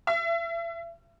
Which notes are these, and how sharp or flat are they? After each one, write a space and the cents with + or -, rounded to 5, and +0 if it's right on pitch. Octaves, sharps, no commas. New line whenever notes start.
E5 +35